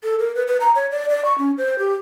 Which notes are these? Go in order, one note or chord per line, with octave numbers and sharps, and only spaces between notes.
A4
A#4
B4
B4
A#5
C#5
D5
D5
C#6
C#4
C5
G4